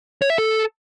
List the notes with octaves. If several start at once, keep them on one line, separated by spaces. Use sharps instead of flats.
C#5
E5
A4